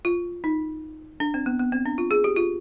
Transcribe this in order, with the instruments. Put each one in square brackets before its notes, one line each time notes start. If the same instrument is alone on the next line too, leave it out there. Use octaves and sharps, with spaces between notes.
[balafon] F4
D#4
D4
C4
B3
B3
C4
D4
F4
G#4
G4
F4